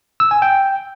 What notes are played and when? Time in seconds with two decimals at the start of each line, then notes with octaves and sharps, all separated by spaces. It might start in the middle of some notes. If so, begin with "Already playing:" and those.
0.20 E6
0.31 G#5
0.42 G5